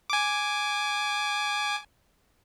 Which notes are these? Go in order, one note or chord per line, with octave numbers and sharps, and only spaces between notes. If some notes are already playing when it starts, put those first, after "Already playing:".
G#5 D6